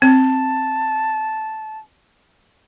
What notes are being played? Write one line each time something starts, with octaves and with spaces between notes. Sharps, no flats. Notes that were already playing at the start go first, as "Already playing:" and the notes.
C4 A5